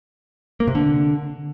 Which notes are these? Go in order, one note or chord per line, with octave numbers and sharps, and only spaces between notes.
A#3
C3
D3